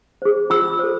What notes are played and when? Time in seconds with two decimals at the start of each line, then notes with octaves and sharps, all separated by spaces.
0.22 G#4 C5
0.50 F4 E6
0.79 A4 C5